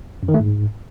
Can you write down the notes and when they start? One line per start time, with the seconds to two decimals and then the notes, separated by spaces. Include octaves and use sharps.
0.23 F#2
0.28 D#3
0.34 A3
0.40 G#2